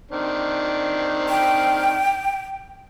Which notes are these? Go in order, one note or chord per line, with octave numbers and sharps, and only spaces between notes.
D#3 C4 D4
G5